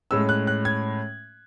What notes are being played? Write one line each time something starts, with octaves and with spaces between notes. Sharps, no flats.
A2 G#3 C#4 E6
F#6
F#6
G#6